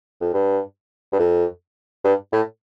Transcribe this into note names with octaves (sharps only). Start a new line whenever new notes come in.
F2
G2
G2
F2
G2
A2